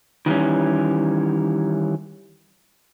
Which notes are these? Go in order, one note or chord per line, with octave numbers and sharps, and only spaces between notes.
D#3 E3 G3 C#4